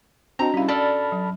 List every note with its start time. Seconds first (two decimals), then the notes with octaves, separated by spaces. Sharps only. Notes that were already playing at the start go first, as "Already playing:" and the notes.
0.39 C4 D4 F#4 D#5 A#5
0.54 G3 C#4 E4 F5
0.68 A4 D5 A5 B5 F6
1.12 F#3